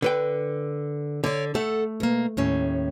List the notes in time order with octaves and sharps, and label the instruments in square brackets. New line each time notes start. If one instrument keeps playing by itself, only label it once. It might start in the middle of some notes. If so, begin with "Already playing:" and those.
[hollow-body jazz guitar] D3 B4 G5
[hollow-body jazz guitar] D3 [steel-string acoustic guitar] C#5 D5
[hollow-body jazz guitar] A3 [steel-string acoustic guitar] A4 F#5
[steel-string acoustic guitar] B2 A#3
D#2 A2 C#4